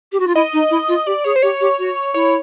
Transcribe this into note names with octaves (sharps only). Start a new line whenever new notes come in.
G4
F#4
F4
E4 D#5
D#4
E4
F4
G4 D5
G#4 C#5
C5
G4 C#5
G4
F#4
E4 C#5